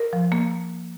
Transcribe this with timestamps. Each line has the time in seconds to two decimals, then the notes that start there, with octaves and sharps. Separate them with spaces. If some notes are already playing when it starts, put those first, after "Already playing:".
Already playing: A#4
0.13 F3
0.32 A#3